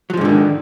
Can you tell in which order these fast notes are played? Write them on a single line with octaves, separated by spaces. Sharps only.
F#3 F3 G#2 D3 D#3